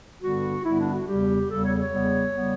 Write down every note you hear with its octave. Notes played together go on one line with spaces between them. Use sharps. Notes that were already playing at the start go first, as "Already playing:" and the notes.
G2 D3 G3 B3 F#4
G2 D3 G3 B3 E4
D4
F#4
E2 C#3 G3 G4
E2 C#3 G3 A4
C#5
C#5
E2 C#3 G3 B3
C#3 G3 B3